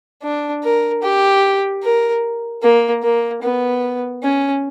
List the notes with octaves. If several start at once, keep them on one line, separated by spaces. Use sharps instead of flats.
D4
A#4
G4
A#4
A#3
A#3
B3
C#4